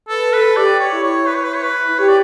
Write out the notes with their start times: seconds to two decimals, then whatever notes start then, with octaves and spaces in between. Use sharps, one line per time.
0.09 A4 B4
0.33 A4 B4
0.57 G4 D5
0.80 C#5
0.92 E4
1.04 C#5
1.28 B4
1.35 C#5
1.44 B4
1.56 C#5
1.63 B4
1.98 G4 C#5
2.08 D5